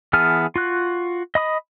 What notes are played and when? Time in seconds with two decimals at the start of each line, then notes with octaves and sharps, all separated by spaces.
0.13 E3 B3 G#4 A5 F6
0.56 F4 F#4 F#6
1.35 D#5 B5 D#6